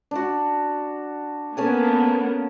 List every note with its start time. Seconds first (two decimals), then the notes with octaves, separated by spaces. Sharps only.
0.11 D4 F#4
1.57 A#3 B3 C#4 A4 G#5